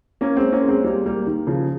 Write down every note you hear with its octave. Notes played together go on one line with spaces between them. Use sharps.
A#3 C#4
G#3 C4
A#3 C#4
G#3 C4
G3 A#3
G3 A#3
D#3
C#3 F3